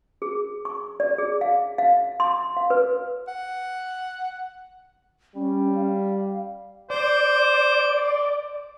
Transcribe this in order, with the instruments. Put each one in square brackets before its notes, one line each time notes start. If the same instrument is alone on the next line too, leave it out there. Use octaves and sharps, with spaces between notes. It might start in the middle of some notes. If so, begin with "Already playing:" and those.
[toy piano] G#4
C#6
D5
G#4
F5
F5
C6
F5
B4
[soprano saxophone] F#5
[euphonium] G3 [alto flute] C#4
[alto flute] F5
[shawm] C5 [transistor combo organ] D5